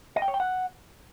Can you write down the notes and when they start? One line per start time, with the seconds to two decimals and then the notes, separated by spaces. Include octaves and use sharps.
0.16 D#5
0.22 G5
0.28 C#5
0.34 G5
0.40 F#5